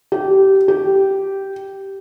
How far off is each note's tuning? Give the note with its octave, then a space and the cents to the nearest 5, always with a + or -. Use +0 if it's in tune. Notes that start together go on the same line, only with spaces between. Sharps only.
G4 -20
G4 -10